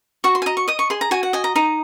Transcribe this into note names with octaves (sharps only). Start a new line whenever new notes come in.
F#4 C#6
C6
G#5
D#5 A#5
C#6
D#5 D#6
C#6
G#4 C6
A#5
F#4 G#5
F#5
D#5 G#5
A#5
D#4 A#5